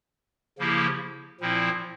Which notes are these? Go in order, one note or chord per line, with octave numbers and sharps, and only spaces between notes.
C#3 F3 A#3 E4 G4
A#2 F3 C4 E4